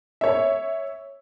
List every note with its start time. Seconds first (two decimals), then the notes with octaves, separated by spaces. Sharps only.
0.21 C#5 E5